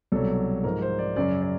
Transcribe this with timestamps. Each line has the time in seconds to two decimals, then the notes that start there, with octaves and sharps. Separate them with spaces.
0.12 C2 B2 F#3 A4
0.64 G#2 F3 A#4
0.82 C5
0.99 D5
1.16 F#2 C#3 F#3 D5
1.42 D5